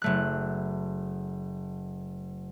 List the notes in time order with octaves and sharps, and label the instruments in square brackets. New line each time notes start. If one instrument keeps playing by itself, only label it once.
[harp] F#1 A3 F#6